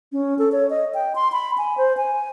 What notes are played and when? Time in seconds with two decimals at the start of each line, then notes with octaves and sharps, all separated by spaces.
0.12 C#4
0.39 A4
0.52 C#5
0.70 D#5
0.94 G5
1.15 C6
1.32 B5
1.58 G#5
1.78 C5
1.97 G#5